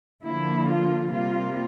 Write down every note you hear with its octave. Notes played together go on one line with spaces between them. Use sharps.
D3 F3 A#3 E4
F4
C3 G3 A#3 F4